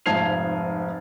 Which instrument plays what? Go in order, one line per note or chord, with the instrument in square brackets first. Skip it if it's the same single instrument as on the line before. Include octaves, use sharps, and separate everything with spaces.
[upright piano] F1 G#2 F3 G#6 C7 F7